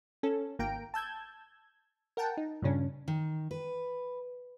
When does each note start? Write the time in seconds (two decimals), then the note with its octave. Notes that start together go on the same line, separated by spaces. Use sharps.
0.23 C#4 A4
0.59 G#1 A#3 G5 A#5 D7
0.94 A5 E6 G6 G#6
2.17 A#4 F#5 G5 A5
2.37 D#4
2.62 G2 A#2 C#3 C#4 D4
3.08 D#3
3.51 B4